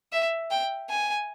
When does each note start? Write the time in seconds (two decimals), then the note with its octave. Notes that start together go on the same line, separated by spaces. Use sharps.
0.13 E5
0.51 G5
0.90 G#5